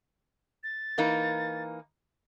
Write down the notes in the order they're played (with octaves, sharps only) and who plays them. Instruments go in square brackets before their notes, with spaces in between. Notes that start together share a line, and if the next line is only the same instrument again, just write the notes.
[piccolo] A6
[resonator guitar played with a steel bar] E3 A#3 D#4